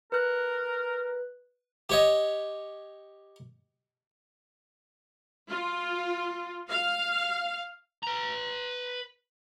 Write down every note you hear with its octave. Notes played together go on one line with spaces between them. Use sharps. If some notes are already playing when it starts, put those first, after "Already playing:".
A#4 B4 F#6
G4 C#5 D#5
F4
F5
B4 A#5